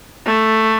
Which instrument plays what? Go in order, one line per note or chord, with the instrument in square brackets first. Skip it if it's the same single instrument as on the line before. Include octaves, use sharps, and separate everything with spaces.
[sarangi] A3